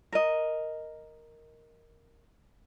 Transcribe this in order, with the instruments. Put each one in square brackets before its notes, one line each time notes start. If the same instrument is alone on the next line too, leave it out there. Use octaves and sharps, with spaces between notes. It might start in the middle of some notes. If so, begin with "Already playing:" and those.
[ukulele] A#4 D#5